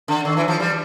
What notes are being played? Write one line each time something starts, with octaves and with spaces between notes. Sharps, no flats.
D3
D#3
E3
F#3
F3
G3